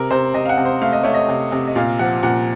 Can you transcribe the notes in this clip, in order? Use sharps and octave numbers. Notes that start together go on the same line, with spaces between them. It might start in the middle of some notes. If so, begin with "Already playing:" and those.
Already playing: C3 A#4
C3 C5
C3 D#5
F5
F#5
C3
C5
A3 F5
D#5
A3 C#5
D#5
C3
C3
D#5
A#2 F5
F3 F#5
A#2 F#5